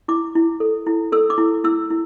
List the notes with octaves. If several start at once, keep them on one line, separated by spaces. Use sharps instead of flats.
E4 D6
E4
A4
E4
A4 E6
D6
E4
E4 E6
E4